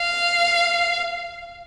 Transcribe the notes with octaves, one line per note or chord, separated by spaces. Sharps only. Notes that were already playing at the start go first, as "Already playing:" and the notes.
Already playing: F5